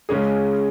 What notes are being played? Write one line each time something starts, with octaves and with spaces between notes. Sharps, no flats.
C#2 C#3 G#3 C#4 G#4